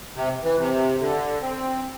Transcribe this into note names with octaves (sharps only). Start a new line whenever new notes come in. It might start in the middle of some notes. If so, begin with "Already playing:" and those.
C3
E3
C3
D3
C4